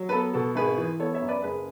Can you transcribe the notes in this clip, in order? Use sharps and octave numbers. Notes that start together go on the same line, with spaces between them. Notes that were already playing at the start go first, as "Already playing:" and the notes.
Already playing: F#3
B4
B3 A4
B2 A4
G#1 G#4 B4
E3
B3 A4 C#5
C#5 E5
F#2
B4 D5
F#1 G#4 B4